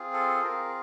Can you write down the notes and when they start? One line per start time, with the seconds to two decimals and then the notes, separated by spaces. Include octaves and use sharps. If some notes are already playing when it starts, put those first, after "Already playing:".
Already playing: C4 F4 G#4
0.13 A4
0.44 C4 F4 G#4 A#4